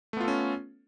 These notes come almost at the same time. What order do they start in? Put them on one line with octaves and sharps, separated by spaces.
A3 B3 F4 A4 C#4